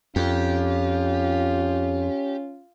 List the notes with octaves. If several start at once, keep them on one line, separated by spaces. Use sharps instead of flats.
F2 C#4 F4 G4